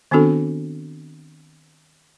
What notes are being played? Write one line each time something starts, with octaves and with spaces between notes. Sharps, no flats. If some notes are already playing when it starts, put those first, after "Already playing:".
D#3 B3 C4 D4 F#4 A4